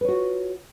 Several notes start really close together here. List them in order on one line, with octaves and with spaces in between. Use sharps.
B4 C#5 F#4 F4